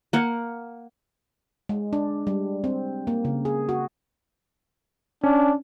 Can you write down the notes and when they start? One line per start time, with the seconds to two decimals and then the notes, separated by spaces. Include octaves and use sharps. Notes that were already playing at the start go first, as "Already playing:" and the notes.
0.13 A#3 F#5
1.69 G#3
1.93 D4
2.27 G3
2.64 C4
3.07 A#3
3.25 C#3
3.45 G#4
3.69 F#4
5.23 C#4 D4